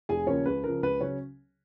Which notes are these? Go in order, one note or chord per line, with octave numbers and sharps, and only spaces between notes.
F1 G#4 G#5
D#2 C#3 F3 C#4 C#5
C#2 B4
C#3 F3 A#4
C#2 B4
C#3 F#3 C#4 C#5